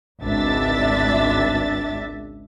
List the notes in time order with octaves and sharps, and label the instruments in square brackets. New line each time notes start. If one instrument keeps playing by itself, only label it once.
[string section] G#1 C#2 D4 E5 A6